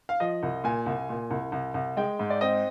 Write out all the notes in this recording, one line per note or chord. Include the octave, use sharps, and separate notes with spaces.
F5
F3 D#5
C2
A#2 G#5
C2
A#2
C2
C2
C2
G#3 G5
G#2
D5
C4 D#5